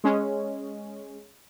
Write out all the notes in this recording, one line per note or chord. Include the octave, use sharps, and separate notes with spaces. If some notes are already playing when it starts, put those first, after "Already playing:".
G#3 C#4